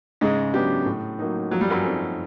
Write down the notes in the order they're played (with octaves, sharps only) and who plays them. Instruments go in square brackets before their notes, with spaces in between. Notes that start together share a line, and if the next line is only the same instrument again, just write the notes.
[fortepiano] G#2 G#3 [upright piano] C#3
[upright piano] F#3 B3 D4 G4
A2
F#3 A#3 D#4
[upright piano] F3 [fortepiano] F#3
[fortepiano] G3
F#2 F#3
[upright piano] A3 C4 D#4